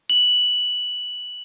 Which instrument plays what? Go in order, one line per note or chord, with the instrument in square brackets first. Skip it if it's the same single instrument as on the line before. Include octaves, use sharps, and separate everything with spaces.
[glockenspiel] F#7